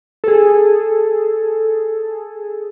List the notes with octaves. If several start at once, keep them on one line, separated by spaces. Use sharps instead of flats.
G#4 A4